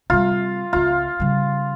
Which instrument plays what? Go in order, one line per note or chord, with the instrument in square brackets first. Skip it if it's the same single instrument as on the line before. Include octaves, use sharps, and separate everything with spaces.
[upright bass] C3 G3 [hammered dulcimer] F4
[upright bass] C#2 C4 [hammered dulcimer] F4
[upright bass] C#3 G3